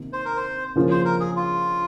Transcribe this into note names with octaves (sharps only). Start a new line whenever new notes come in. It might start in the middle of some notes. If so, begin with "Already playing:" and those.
Already playing: C3 D#3 A#3
C5
A#4
C5
C#3 F3 A#3 C#4 F4
C5
A#4
G#4
F4